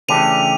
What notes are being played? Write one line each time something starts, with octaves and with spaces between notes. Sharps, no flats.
C#3 E3 A3 D4 G4 D#7 F7